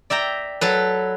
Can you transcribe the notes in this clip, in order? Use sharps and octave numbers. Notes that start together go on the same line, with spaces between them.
D5 E5 G5 A#5
F#3 A4 B4